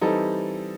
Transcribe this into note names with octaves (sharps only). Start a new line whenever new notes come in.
E3 G3 C4 D#4 A4